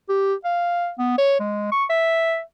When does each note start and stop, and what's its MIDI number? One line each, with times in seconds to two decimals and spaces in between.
0.09 0.34 67
0.45 0.90 77
0.99 1.18 59
1.18 1.39 73
1.40 1.69 56
1.72 1.85 85
1.90 2.41 76